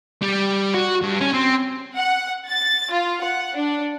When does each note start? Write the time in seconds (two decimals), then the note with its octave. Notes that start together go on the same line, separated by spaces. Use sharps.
0.22 G3
0.74 F#4
1.02 G2
1.20 C#4
1.33 C4
1.96 F#5
2.48 A6
2.92 F4
3.24 F#5
3.55 D4